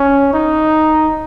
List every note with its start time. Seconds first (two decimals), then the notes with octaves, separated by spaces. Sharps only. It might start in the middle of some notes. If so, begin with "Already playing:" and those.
Already playing: C#4
0.33 D#4